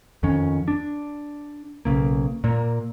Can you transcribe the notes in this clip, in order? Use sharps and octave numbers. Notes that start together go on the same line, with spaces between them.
F2 D#3 C#4
D4
B1 F2 C#3 A#3
A#2 A#3